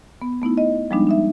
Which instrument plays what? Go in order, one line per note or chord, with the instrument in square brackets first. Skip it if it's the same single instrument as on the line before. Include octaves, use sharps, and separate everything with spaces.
[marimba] B3
A3 B3 D#4 E4
D#5
F3 G3 G#3 B3 D4 D#4
D4 D#4 E5